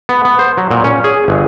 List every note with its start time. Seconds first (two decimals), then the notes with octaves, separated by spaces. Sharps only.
0.09 B3
0.25 B3
0.39 C5
0.57 F#3
0.71 A#2
0.84 C#4
1.04 G#4
1.28 G1